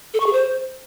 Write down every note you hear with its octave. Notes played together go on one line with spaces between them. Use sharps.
A4
C#6
G#4
C5